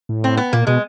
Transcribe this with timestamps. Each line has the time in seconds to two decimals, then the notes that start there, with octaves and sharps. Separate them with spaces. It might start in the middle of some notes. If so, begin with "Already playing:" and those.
0.09 A2
0.24 C4
0.37 B3
0.53 A#2 A#3
0.67 B2 G#3